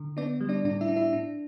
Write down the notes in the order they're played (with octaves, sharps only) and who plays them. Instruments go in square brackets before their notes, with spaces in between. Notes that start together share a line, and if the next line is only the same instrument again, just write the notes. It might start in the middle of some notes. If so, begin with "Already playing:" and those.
Already playing: [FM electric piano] D3
B3 D4 D5
G3
D4 D5
A2 D4 D5
E4 E5
D4
E4 E5
D4